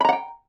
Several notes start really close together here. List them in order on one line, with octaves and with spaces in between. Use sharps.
B5 A#5 F#5 G5